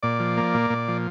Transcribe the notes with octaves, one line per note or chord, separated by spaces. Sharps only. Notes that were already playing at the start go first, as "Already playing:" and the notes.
A#2 D5
F3
A#3
A#2
A#2
F3